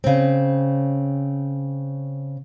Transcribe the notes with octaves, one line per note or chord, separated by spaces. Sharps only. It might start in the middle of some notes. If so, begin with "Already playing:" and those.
C#3 C4